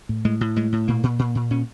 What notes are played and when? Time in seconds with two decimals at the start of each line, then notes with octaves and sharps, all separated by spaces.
0.09 A2
0.25 A2 G#3
0.41 A2
0.56 A2 G#3
0.72 A2
0.88 A#2 A#3
1.03 A#2
1.19 A#2
1.35 A#2
1.50 A#2 C#4